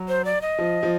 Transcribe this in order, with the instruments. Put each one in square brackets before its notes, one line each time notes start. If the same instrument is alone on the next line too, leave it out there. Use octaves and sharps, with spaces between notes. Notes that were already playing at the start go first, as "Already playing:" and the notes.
Already playing: [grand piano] F#3
[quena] C5
D5
D#5
[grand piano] F3
F3